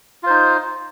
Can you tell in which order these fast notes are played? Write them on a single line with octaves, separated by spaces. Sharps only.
F4 C5 D#4